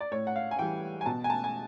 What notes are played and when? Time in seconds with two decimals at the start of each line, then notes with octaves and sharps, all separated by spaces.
0.01 D5
0.11 A2 C#5
0.27 F#5
0.36 F5
0.51 G#5
0.59 E3 G3 G5
1.01 G#5
1.06 B2 A5
1.24 G#5
1.30 A5
1.44 G#5